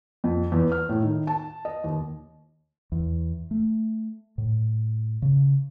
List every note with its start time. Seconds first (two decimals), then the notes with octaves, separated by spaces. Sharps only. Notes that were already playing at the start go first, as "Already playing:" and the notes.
0.24 F2
0.52 E2
0.72 F6
0.89 A2
1.02 D#3
1.27 A5
1.65 D#5
1.84 D#2
2.92 E2
3.51 A3
4.38 A2
5.22 C#3